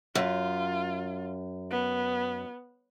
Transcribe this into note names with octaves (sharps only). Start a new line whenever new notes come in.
F#2 F4
B3